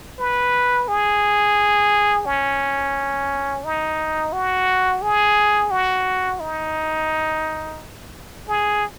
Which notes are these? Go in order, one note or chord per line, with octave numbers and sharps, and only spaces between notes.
B4
G#4
C#4
D#4
F#4
G#4
F#4
D#4
G#4